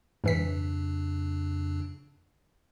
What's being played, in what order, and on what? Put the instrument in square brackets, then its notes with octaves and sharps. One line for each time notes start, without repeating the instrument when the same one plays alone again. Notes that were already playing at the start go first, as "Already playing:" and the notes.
[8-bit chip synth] F2 C#3 D4 [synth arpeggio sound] G#2 E3 B6